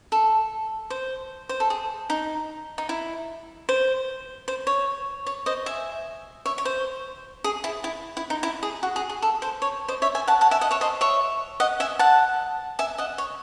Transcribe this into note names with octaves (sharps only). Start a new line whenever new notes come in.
A4
C5
C5
A4
G#4
D#4
D#4
E4
C5
C5
C#5
C#5
C5 D#5
E5 G#5
C#5 E5
C#5
C5
G#4
E4
E4
E4
D#4
E4
G#4
F#4
G#4
G#4
A4
C5
C#5
C5 D#5
C#5 E5
E5 G#5
F#5 A5
F#5 A5
E5 G#5
D#5 F#5
C#5 E5
C5 D#5
C#5 E5
D#5 F#5
E5 G#5
F#5 A5
E5 G#5
D#5 F#5
C#5